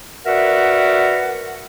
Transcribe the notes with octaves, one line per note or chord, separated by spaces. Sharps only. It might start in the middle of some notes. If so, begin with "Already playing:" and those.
F#4 A#4 B4 D5 E5 F#5